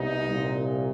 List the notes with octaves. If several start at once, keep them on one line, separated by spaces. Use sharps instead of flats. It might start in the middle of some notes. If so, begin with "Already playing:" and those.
Already playing: C2 B2 D#4
C2 A#2